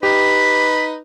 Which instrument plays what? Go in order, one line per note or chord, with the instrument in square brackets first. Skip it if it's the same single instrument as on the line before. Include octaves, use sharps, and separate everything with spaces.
[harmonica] D#4 B4 [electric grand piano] G4 [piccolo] B6